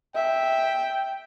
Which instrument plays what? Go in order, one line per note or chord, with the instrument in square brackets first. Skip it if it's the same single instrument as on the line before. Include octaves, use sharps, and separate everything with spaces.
[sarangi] E5 [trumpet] G5